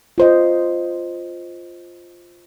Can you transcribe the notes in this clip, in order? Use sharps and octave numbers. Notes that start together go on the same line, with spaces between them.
F4 C5 D#5